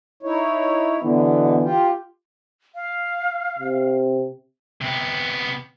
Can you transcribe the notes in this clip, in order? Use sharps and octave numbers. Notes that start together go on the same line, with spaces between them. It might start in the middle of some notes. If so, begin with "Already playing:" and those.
D#4 E4 C#5
B2 D3 E3 B3
F4 G4
F5
C3
C3 B3